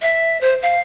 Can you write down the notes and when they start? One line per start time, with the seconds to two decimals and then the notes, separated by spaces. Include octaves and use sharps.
0.02 E5
0.41 C5
0.62 F5